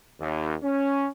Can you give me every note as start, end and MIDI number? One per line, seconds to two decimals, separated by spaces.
0.20 0.54 39
0.63 1.07 61